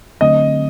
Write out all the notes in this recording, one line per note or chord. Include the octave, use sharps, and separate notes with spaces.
D3 F#3 A3 C4 D#5